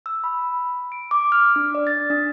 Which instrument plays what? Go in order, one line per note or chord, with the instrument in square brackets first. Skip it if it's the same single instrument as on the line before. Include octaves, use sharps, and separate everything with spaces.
[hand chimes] E6
B5
D7
D6
F6
D4
D5
A6
D4